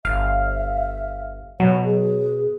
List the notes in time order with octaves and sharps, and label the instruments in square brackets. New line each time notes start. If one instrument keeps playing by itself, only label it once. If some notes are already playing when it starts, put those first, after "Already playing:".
[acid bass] G1 [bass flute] E5 [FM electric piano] F5
[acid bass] B2 [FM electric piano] F#3 [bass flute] C#5
[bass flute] G#4